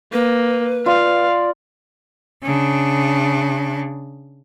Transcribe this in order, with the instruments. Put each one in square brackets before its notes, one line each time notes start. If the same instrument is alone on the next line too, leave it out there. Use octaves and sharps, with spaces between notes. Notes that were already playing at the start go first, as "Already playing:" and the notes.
[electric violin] A#3 [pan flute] B4
[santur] F4 [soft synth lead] D5 [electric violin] F5
[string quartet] C#3 D4